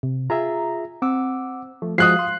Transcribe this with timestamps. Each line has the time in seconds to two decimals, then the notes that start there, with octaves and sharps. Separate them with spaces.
0.03 C3
0.30 F4 G#4 E5 A#5
1.02 C4 F#5 D6 E6
1.82 F3 A3
1.98 F3 G#3 F#4 F5 D#6 F#6 C7
2.19 C6